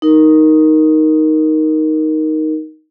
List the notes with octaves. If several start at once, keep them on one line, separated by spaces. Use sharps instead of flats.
D#4 A#4